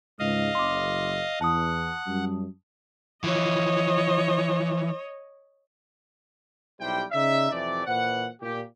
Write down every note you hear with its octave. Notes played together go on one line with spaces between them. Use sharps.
C#2 G#2 D#5 F5
F#1 C6 D6
E2 F#5 A5 D#6
F#2 G3
E3 F3 C#5 D#5
B1 G3 E4 G4 C5 G5
C#3 D#4 D5 E5
F2 C3 E3 A3 D5
A#2 E3 C5 F#5
A#2 G4